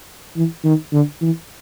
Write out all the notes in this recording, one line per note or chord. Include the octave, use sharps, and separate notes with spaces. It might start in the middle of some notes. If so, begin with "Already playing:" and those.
E3
D#3
D3
E3